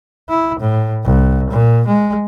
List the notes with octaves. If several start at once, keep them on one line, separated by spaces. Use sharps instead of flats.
E4
A2
C2
A#2
G#3